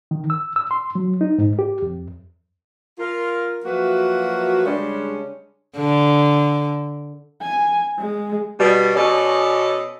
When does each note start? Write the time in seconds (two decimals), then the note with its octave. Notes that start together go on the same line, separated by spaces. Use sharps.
0.11 D#3
0.30 E6
0.56 E6
0.71 C6
0.95 F#3
1.21 D#4
1.38 G#2
1.59 G4
1.82 F2
2.99 F4 A#4
3.65 F3 F#3 A#3 F#4 B4 E5
4.65 C#3 G3 G#3 C#4 D4
5.77 D3
7.42 G#5
7.99 G#3
8.59 B2 G3
8.95 B2 C#4 A4 D5 D#5